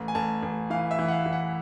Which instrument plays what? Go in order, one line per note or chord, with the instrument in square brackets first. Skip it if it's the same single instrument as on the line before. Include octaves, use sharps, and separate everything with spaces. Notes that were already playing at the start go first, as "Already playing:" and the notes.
Already playing: [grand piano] A1
G#5
A1 A5
A1
E3 F5
E5
E3
F#5
F5
E3
F#5